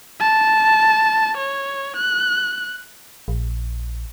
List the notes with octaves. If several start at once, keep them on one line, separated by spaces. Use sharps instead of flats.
A5
C#5
F#6
A#1